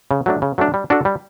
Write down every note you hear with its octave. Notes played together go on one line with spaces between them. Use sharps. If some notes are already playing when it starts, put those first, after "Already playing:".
C#3
F#3 A3 D4
C#3
F#3 A3 D4
G3
D4 F#4 A4
G3